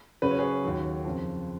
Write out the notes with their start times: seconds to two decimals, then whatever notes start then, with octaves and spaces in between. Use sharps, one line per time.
0.22 F#2 C#3 F#3 B4
0.31 C#5
0.39 G#4 B4
0.64 D#2 D#3 F#3
1.05 F2 C#3 F3